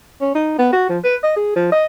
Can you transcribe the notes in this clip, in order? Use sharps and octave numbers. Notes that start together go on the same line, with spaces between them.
C#4
D#4
B3
F#4
F3
B4
D#5
G#4
F3
D#5